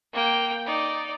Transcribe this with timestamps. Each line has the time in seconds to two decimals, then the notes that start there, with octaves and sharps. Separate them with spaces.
0.13 A#3 G5
0.65 D#4 D5